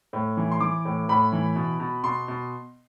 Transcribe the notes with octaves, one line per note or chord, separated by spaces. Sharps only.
A2
E3
C6
E3 D6
A2
A2 B5
E3
B2
B2
B2 C6
B2